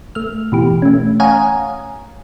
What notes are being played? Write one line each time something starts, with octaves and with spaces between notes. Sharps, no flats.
A3 F6
B2 E3 G4
A3 C#4
C#5 F5 F#5 G#5 A#5 D#6